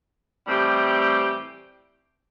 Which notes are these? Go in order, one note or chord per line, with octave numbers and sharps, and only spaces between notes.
A2 E3 G3 C4 G4